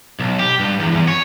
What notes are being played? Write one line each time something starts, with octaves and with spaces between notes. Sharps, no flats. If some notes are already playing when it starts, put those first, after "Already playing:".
B1
G4
G2
E2
E2
C#5